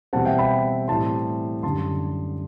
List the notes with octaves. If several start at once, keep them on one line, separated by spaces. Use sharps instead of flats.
E2 B2 G3 C4 F#5 A5
E5 G5
G5 B5
A2 E3 G3 C4 A5 C6
F#2 D3 G3 A5 C6